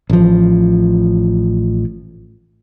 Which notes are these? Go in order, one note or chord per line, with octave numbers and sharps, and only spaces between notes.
A1 F3